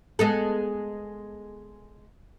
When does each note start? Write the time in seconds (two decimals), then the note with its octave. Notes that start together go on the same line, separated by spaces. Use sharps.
0.19 G#3 B3 A4